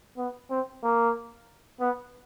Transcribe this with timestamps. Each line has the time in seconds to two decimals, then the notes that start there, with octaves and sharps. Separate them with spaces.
0.18 B3
0.50 C4
0.83 A#3
1.81 B3